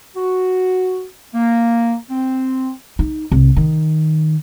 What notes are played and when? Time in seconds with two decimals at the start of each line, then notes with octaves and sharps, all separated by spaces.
0.16 F#4
1.34 A#3
2.10 C4
2.99 D#4
3.32 C2
3.56 D#3